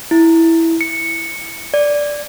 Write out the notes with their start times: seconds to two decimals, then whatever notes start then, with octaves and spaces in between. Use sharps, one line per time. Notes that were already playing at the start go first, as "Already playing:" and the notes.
0.11 E4
0.81 C#7
1.74 D5